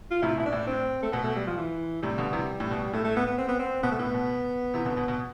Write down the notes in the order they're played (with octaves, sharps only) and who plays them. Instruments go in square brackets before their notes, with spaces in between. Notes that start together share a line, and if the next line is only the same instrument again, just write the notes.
[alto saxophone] F4
[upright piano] A2 C3 [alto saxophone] E4
[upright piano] B2 [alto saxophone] E4
[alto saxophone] D4
[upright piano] A2
[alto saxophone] C4
A3
[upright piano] B2 [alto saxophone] B3
[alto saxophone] A3
G3
F3
E3
[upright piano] A2 C3 [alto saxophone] G3
[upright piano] B2 D3
C3 E3
A2
B2
[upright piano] A2 [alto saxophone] A3
[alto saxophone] A3
B3
B3
C4
B3
C4
[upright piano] B2 [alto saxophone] B3
[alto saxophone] A3
[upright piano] A2 [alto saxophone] B3
[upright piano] B2
C3 E3
B2 D3
B2
B2